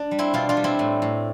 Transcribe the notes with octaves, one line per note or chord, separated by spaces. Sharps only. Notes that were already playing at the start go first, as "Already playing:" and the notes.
Already playing: D4
G3
C4 E4
B2 D4 F4
D4 F4
G3
C4 E4
A2
A2